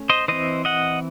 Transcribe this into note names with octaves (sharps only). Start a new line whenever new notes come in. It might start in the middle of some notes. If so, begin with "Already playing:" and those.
Already playing: A3 C#4
C5 D#5
E3 C4 C5 D#5
D#5 F#5